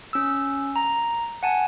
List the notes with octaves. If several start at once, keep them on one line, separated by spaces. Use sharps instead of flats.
C#4 E6
A#5
F#5 G#5 A5